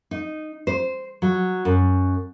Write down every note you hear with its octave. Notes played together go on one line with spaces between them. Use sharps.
D#4
C5
F#3
F#2